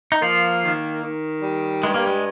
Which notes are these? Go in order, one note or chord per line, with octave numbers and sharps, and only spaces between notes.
D#4
F3 A#3 F4
D#3
D#3
G3
G2 G#3
A#3
G#3